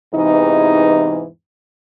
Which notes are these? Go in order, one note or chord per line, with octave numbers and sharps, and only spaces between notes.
E2 G#2 C3 E3 D#4